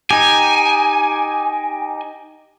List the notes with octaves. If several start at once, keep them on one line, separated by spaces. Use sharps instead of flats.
D#4 G4 G#5